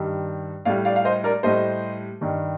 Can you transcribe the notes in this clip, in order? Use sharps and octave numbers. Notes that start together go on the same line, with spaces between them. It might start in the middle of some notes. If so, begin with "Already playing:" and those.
Already playing: G2 D#3 G3
A2 G3 D5 F5
D5 F5
F5
C5 D#5
A#4 D5
A2 G3 C5 D#5
G2 D#3 G3